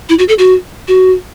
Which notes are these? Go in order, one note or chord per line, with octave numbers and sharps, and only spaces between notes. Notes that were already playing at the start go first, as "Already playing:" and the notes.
E4
F#4
A4
F#4
F#4